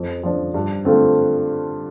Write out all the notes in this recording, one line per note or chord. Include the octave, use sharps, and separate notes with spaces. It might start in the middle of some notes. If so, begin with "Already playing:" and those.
Already playing: F2
F3 D4
G2
D3 A3 C4 F4